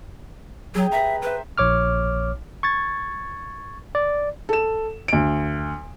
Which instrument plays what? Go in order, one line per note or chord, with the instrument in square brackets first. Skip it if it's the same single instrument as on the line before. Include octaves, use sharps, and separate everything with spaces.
[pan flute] F#3 [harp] G#4 G5
[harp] B4 A#5 [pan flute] E5
[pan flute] B4 [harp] C5 E5
[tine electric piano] A#1 C#5 D6 F6
C#6 G#6 A6
D5
[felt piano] A4 E7
D2 D7